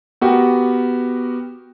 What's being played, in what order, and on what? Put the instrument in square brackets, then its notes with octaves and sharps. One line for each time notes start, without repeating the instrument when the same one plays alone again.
[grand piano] B3 F#4 G4 A#4